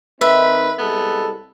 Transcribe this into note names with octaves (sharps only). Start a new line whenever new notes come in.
D#3 C4 D#4 B4 E5
C2 G#3 B3 A4